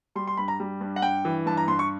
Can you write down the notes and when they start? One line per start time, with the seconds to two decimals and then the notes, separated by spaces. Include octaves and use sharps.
0.16 G3 C6
0.27 C6
0.37 G2 B5
0.48 A#5
0.60 G3
0.81 G2
0.96 F#5
1.02 G2 G5
1.25 E3
1.46 G2 A5
1.57 A#5
1.68 G2 C6
1.79 C#6